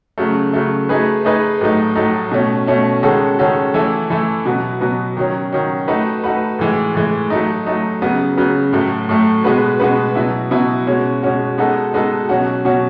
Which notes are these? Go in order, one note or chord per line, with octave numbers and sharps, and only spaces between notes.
C#3 F#3 A3
C#3 F#3 A3
A3 D#4 G#4 B4
A3 D#4 G#4 B4
A2 F#3 A3 D#4
A2 F#3 A3 D#4
B2 A3 C#4
B2 A3 C#4
D#3 G#3 C#4 F#4 A4
D#3 G#3 C#4 F#4 A4
E3 A3 E4 A4
E3 A3 E4 A4
B2 F#3 B3
B2 F#3 B3
D#3 F#3 C#4
D#3 F#3 C#4
A3 D#4 F#4 B4
A3 D#4 F#4 B4
A2 E3 G#3
A2 E3 G#3
F#3 A3 D#4
F#3 A3 D#4
C#3 F#3 B3
C#3 F#3 B3
A2 F#3 A3
A2 F#3 A3
B2 G#3 B3 F#4 B4
B2 G#3 B3 F#4 B4
B2 F#3 B3 E4
B2 F#3 B3 E4
B2 G#3 C#4 F#4
B2 G#3 C#4 F#4
G#3 B3 D#4 F#4 A4
G#3 B3 D#4 F#4 A4
B2 F#3 C#4 F#4
B2 F#3 C#4 F#4